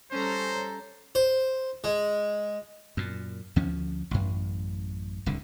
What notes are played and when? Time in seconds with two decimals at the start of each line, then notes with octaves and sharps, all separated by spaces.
0.12 G3 C#4 A4 C5 A#5
1.15 C5
1.84 G#3
2.97 F#2 A#2
3.56 D2 F3 C#4
4.11 A1 F#2
5.26 D1 C2 D3